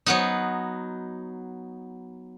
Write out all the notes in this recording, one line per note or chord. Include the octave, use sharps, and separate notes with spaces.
F#3 B3 D#4